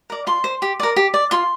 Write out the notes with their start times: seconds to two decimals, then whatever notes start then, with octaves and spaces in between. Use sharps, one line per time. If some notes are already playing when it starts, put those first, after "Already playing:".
0.10 A#4 D5
0.27 F4 C6
0.44 C5
0.62 G4
0.80 A#4 D5
0.96 G4
1.14 D5
1.31 F4 C6